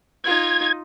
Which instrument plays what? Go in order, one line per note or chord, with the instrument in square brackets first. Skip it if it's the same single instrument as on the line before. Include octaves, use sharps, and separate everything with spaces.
[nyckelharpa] D#4 F4 [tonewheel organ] G#6